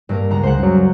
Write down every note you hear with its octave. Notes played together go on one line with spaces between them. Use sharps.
G2 A#3 A#4
C#2 F#5 A#5
C#2 C5 F#5
F#2 F#3